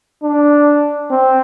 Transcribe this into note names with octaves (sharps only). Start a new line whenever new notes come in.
D4
C4